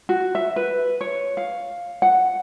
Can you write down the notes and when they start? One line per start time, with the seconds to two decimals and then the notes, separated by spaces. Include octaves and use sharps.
0.09 F#4
0.35 E5
0.56 B4
1.01 C#5
1.37 F5
2.02 F#5